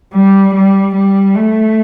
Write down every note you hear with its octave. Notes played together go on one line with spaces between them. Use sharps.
G3
G3
G3
A3